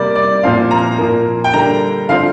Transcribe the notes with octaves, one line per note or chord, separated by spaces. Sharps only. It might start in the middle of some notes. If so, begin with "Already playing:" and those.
Already playing: C3 G3 A#3 D5
D5
A#2 F3 C4 F5
A#5
A#2 F3 A#3
G5
D3 G3 A#3 A#5
D3 F3 C4 F5